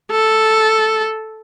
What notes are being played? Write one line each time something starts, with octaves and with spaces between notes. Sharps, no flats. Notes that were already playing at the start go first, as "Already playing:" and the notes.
A4